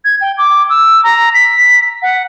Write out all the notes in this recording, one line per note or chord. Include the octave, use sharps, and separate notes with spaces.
G#6
G5
D6
E6
A#5
B6
F#5